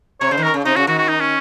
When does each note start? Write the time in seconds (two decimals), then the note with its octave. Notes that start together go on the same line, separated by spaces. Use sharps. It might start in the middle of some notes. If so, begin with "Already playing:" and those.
0.21 C3 C#5
0.31 C#3 C5
0.37 D#3
0.43 A#4
0.54 C#3
0.65 C3 D#4
0.76 C#3 F#4
0.87 D#3 F#4
0.98 F#4
1.09 D#4
1.20 C#4